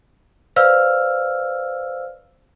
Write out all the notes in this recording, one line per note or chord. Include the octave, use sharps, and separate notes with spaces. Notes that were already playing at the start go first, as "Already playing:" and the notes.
B4 C5 D5 F5 E6 F6